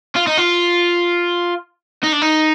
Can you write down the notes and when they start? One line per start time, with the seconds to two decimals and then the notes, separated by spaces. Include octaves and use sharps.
0.17 F4
0.28 D#4
0.38 F4
2.04 D#4
2.13 D4
2.22 D#4